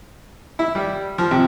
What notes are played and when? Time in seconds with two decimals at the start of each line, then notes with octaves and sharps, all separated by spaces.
0.59 E4
0.75 G3
1.18 F3
1.31 C3